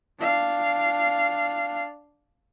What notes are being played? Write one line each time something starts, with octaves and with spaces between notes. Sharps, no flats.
D4 F5